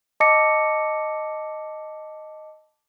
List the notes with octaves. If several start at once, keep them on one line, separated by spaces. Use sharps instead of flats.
D#5 A5 D6 E6 A#6 C#7